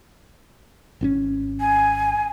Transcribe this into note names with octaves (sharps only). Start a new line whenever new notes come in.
G#1 C4 C#4
G#5